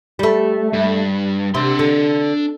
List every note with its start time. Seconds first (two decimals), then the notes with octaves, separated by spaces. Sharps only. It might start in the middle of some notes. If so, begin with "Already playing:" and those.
0.19 G3 A3
0.73 G2
1.55 C3 D4 C6
1.79 D3